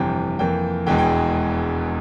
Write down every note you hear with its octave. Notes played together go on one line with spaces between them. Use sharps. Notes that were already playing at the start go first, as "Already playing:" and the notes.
Already playing: G1 F2 C3 E3 G5
F2 E3 A#3 G5
E1 E2 E3 G#3 G5
G5